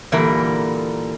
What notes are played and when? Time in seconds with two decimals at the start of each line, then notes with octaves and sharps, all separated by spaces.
0.12 A#2 D3 E3 G3 A#4